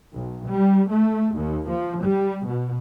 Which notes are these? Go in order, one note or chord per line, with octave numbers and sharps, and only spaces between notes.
B1
G3
A3
D#2
F3
G3
B2